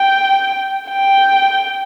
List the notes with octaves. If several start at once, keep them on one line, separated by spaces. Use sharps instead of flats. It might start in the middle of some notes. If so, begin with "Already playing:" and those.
Already playing: G5
G5